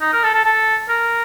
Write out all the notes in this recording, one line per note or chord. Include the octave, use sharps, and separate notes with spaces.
D#4
A#4
A4
A4
A4
A#4